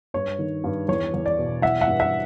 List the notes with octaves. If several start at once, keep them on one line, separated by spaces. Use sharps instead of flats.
G2 C#5
D#3
G2
E2 C#5
E2
D5
B2
E3 E5 F#5
E5 F#5
G2
E5 F#5